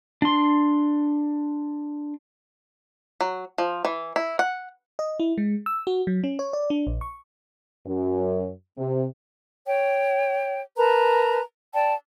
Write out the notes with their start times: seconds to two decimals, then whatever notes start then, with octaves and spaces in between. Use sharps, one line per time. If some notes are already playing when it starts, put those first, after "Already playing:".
0.22 D4 C6
3.21 F#3
3.58 F3
3.85 E3
4.16 E4
4.39 F#5
4.99 D#5
5.20 E4
5.38 G#3
5.66 E6
5.87 F#4
6.07 F#3
6.24 C#4
6.39 C#5
6.53 D5
6.70 D4
6.87 A#1
7.01 C#6
7.87 F#2
8.78 C3
9.66 C#5 G5
10.77 A#4 B4 A5 A#5
11.74 D5 G5 A5